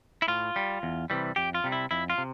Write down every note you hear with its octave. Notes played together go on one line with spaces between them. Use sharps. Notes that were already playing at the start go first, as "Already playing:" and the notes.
E4
A2 F4
G3
E2
C3 E3 G3
F2 G4
F4
C3 G3
E4
F2 E4
F4
C3